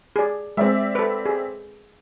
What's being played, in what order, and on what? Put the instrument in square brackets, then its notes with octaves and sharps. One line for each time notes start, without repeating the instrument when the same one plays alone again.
[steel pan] G#4 D5
[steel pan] G#3 [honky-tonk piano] C4 D5 E5
[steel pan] A4 B4
G#4